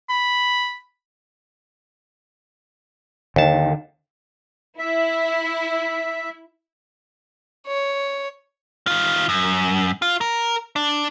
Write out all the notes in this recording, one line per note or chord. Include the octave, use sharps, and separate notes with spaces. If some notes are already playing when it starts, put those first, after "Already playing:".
B5
D#2 D3 D#3 A5
E4 E5
C#5
D#3 F4
F#2
F4
A#4
D4